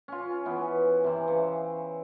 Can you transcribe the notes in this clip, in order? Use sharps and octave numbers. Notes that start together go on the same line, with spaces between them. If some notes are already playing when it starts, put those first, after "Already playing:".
C#4 F4
E3 B3
C3 E3
C#3